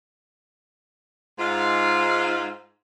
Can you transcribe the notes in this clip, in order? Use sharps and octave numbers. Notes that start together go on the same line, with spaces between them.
G#2 F4